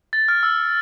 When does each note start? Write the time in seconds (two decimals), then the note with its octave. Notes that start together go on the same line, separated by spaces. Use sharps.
0.13 A6
0.28 F6
0.43 E6